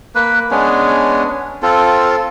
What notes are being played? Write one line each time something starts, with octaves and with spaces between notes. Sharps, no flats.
A#3 B4
G#3 B3 C#4 D4
C4 F4 A4